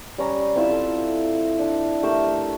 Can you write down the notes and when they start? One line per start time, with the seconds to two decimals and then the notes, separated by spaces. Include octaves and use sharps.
0.18 G3 C#4 A#5
0.56 C4 E4 F4 E5
0.70 A4
1.59 D4
2.03 A3 G4 A#4 E6